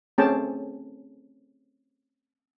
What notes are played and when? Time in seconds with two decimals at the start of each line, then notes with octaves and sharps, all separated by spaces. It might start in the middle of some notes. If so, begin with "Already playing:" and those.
0.18 A3 C4 C#4 G#4 G5 A5